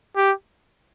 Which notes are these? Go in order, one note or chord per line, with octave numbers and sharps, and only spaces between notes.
G4